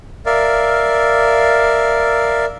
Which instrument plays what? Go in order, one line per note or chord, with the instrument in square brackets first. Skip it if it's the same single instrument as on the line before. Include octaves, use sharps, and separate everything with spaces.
[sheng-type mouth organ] A#4 D5 E5 F5